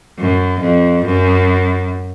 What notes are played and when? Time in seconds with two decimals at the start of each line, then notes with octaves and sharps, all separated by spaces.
0.19 F#2
0.61 F2
1.06 F#2